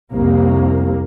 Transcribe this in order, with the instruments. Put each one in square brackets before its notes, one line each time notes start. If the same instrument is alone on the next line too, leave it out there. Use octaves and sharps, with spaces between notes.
[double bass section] C2 F2 A#3